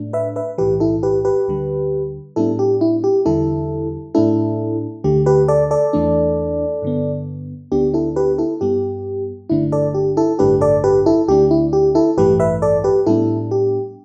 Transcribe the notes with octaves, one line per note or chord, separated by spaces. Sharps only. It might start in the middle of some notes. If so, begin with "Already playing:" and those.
Already playing: A2 A3 D4
B4 E5
B4 E5
B1 A2 E3 G4 B4
E4 A4
G4 B4
G4 B4
D2 D3 G3
A2 G3 B3 D4 E4 A4
G4
E4
G4
E2 D3 G3 E4 A4
A2 A3 D4 E4 A4
D2 D3 A3 G4
G4 B4
A4 D5
A4 D5
E2 E3 A3 D4
G2 D3 B3
D2 D3 B3 D4 G4
E4 A4
G4 B4
E4 A4
G2 G3 B3 G4
G1 G2 D3 A3 D4 E4
A4 D5
G4
E4 A4
A1 G2 D3 A3 D4 G4 B4
A4 D5
G4 B4
E4 A4
D2 D3 A3 D4 G4
E4
G4
E4 A4
A1 G2 E3 A3 G4 B4
B4 E5
A4 D5
G4 B4
A2 G3 B3 D4 E4 A4
G4